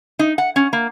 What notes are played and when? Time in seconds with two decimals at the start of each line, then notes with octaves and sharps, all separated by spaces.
0.19 D#4
0.38 F#5
0.56 C#4
0.73 A#3